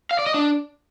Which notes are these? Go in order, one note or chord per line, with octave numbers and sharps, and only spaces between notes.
F5
D5
D#5
D4